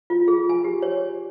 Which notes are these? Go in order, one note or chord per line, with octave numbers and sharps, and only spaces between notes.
F4
G#4
G#5
G4
C#5